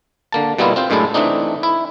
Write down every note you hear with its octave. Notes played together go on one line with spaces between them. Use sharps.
D3 A#3 A5
B2 G3 A#3 B3 E4 F4
C4 F4 C5
F#2 A2 G#3 D4 E4 A5
E3 A3 C4 D4 D#4
E4